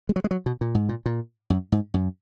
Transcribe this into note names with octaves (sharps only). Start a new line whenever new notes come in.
G#3
F#3
G#3
F#3
B2
A#2
G#2
A#2
A#2
F#2
G#2
F#2